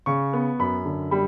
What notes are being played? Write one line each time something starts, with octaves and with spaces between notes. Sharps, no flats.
C#3 C#6
B3
F#2 B5
D3
G3 B5